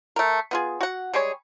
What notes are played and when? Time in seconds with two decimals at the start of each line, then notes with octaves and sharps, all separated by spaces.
0.16 A3 A#4
0.51 B3 F4 G#4
0.81 F#4 F#5
1.14 G3 G#3 G#4 C#5